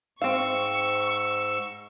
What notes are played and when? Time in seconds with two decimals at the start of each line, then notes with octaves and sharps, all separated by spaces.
0.22 G#2 C4 F5 C#6 E6